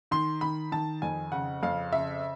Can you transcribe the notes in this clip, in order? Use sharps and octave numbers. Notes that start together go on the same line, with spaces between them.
D#3 C6
D#3 B5
D#3 A5
F2 G#5
C#3 F#5
F2 F5
C#3 E5